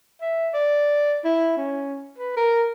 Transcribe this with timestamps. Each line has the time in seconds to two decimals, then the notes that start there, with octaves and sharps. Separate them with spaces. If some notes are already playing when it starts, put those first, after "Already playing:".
0.21 E5
0.54 D5
1.25 E4
1.57 C#4
2.18 B4
2.37 A#4